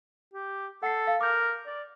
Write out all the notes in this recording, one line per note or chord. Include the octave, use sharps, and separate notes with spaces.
G4
A4 F#5 A5 C7
F5
A#4 D6 G6
D5